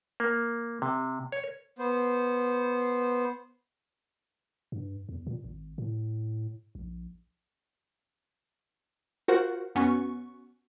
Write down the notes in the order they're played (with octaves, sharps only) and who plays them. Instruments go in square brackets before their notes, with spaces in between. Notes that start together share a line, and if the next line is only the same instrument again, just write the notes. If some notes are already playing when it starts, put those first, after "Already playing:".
[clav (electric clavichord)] A#3
C3
C#5
[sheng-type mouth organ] B3 C5
[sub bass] G2
E2
A#2
G#1
A2
A#1
[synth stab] F4 F#4 A#4 C5 F#5
F#2 B3 C#4 F#4 C#6